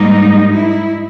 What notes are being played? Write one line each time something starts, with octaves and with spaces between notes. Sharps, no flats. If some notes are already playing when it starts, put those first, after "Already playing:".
Already playing: G#2 G3 A#3 D#4
E4